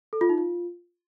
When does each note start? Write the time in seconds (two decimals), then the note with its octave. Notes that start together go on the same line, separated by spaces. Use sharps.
0.13 A4
0.21 F4
0.29 D#4
0.38 F4